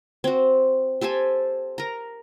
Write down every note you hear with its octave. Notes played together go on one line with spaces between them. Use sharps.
C4 F#4
G4 A4 C5 G#5
A#4 A#5